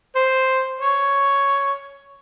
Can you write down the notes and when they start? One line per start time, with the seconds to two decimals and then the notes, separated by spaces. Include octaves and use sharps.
0.15 C5
0.81 C#5